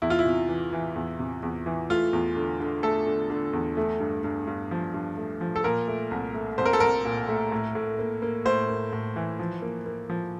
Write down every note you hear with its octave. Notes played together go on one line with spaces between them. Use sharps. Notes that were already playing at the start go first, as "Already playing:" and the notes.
E2 E4
F4
E4
C3
E3
E3
E2
C3
E2
E3
A3 F4
E2
D3
D3
A3 A4
D3
D3
E2
A3
G2
G2
G2
F3
G2
A3
F3
A4
A#2 A#4
A3
C2
A3
C2 C5
A#4
A4
C2 A#4
A#2
A3
A2
A2
A#3
A#3
A2 C5
A#3
A2
E3
F3
A#3
A#3
F3